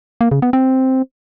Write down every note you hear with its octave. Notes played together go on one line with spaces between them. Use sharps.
A#3
C#3
B3
C4